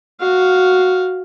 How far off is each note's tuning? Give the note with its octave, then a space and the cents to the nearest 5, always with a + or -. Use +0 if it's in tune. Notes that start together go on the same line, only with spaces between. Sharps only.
F#4 -5 F5 +0